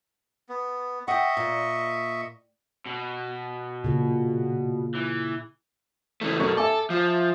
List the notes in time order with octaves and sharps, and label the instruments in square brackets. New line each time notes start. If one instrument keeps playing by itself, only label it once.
[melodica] B3
[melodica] D#5 E5 C#6 [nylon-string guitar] F#5 G5
[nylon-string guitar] A#2
[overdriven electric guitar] B2
[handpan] A#2 C#3
[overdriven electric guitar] E3
[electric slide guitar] C#3 E3 A3
[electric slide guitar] F#2 B2 [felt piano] A3 A#4 C#6
[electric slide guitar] A4 [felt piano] E5 G#5 D6
[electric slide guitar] F3